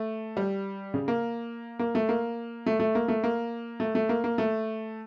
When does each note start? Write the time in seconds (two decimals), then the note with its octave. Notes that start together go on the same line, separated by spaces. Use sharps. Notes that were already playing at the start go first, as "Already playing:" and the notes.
Already playing: A3
0.37 G3
0.94 C#3
1.08 A#3
1.79 A#3
1.95 A3
2.09 A#3
2.66 A3
2.80 A3
2.95 A#3
3.08 A3
3.24 A#3
3.80 A3
3.95 A3
4.09 A#3
4.24 A#3
4.38 A3